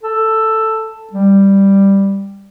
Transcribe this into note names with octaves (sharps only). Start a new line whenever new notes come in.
A4
G3